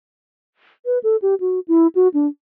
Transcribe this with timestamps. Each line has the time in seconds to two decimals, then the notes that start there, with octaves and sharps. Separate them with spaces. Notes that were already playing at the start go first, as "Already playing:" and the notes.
0.86 B4
1.03 A4
1.22 G4
1.40 F#4
1.68 E4
1.95 F#4
2.14 D4